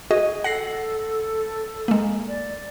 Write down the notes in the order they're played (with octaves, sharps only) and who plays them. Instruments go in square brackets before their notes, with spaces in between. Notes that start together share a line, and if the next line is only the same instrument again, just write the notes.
[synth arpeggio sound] F#4 G#4 D#5
[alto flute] A4 [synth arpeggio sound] F#5 A#6 C7
[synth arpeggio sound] G#3 A#3
[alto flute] D5